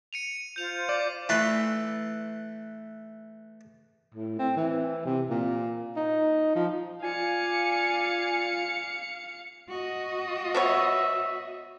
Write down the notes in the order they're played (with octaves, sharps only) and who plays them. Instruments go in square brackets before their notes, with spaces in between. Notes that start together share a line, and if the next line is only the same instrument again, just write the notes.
[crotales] C#7 D#7 F7
[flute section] F4 C5 [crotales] G6 F7
[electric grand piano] D5 [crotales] D6
[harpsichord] E3 A3 B4 C6
[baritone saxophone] A2
C4
E3
C3
A#2
D#4
F3
[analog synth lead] F4 [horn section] D5 G#5 [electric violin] F5 C#7
[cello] F#4 D#5
[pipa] B3 B4 C#5 [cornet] E5